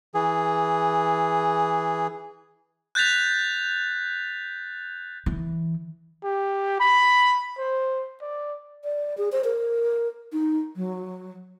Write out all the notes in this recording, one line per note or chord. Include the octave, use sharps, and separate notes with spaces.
E3 G#4
F#6 G6 A6 B6 F7
E3
G4
B5
C5
D5
D5
G#4
C5
A#4
D#4
F#3